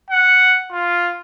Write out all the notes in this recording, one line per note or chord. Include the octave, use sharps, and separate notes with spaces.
F#5
F4